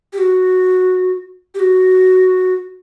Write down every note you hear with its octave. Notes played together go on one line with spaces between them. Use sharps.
G4
F#4
G4
F#4